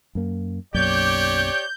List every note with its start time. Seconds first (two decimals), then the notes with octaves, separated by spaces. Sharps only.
0.15 F#2 A#3
0.74 B1 F#2 A#3 G4 C#5 D5 G6